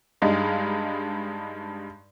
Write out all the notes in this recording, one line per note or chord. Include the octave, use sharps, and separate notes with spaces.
G2 G3 G#3 D#4 F5